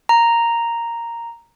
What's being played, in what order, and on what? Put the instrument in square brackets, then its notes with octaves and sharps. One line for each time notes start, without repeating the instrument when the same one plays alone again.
[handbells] A#5